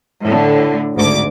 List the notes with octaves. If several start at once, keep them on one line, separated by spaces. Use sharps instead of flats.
A2 D3
G#1 D2 D6